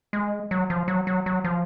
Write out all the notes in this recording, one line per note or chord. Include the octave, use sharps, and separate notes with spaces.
G#3
F#3
F3
F#3
F#3
F#3
F3